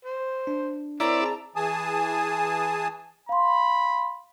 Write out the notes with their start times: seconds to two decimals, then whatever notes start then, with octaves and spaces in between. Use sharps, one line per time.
0.05 C5
0.47 D4
1.00 C4 E4 A#4 C#5 D5 A#5
1.22 G#4 A5
1.56 E3 G#4 G#5 A5 D#6
3.29 F5 B5 C6